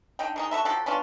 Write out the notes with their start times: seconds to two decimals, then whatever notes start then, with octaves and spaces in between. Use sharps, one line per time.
0.19 D3 D#4 G5
0.36 D#3 G#3 D#4
0.51 F#4 A4 B4 E5
0.65 F3 F#3 G4 A4
0.86 B3 C#4 D4 F4